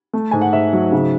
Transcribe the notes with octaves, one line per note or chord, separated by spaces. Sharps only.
A3
G#2 G#5
F#5
G#2 E5
F#3
C#3